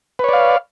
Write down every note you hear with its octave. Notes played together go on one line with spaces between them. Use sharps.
B4 C#5 D5 F5